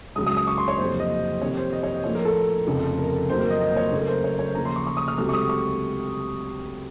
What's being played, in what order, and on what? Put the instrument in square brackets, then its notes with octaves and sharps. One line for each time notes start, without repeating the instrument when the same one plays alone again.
[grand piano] C#2 C#3 F#3 D#6
D#6
D#6
C#6
C6
C#5
F#1 F2 C3 C5
D#5
F2 C3 D#3 C#5
C5
D#5
C#5
D#5
A#1 A2 F3 A#3 C#5
A#4
A4
F1 F2 C#3 F3 A3
A#4
F#1 F2 D#3 F#3 A#3 C5
A#4
D#5
D#5
C#5
F#2 C#3 A3
A#4
C5
C#5
C#5
D#2 C#3 F3 A#5
C6
C#6
C#6
D#6
F6
C#2 C3 F#3 A3 C4 F6
C#6
D#6
C#6